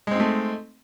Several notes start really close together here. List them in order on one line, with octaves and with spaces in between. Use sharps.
G#3 C4 D#4 A3